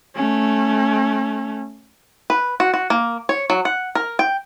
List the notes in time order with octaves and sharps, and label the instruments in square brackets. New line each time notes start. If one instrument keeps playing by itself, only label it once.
[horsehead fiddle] A3 C#4
[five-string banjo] B4
F#4
F#4
A#3
C#5
F#3
F#5
A#4
G5